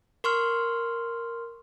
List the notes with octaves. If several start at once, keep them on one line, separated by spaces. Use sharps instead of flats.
A#4 C6 C#6 F6